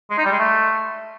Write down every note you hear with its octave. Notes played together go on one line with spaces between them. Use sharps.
G#3
D#4
G3
G#3
A3